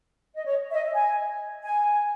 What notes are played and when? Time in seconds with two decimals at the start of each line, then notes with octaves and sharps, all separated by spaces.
0.36 D#5
0.44 C#5
0.70 E5
0.74 D#5
0.85 E5
0.94 G#5
1.63 G#5